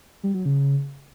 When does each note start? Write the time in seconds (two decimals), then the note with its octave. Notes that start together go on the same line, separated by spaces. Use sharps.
0.23 G3
0.34 F#3
0.45 C#3